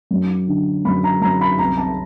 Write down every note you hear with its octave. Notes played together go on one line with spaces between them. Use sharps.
F#2
D3
F#2 B5
A#5
F#2 A#5
B5
C2 A#5
A5